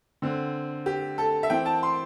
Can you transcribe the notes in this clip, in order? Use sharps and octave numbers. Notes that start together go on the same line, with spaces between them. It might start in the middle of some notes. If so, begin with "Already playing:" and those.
D3 C4
G4
A4
E5
E3 C4 G5
A5
C6